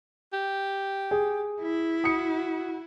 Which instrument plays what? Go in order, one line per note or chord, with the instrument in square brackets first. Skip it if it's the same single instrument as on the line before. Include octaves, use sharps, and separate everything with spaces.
[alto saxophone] G4
[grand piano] G#4
[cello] E4
[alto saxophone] F#4 [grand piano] D#6 C#7